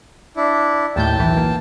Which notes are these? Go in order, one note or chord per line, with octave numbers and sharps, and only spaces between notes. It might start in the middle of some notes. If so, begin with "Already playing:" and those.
D4 E4
D#2 A2 G5 A5 G6
B1 E3
A#3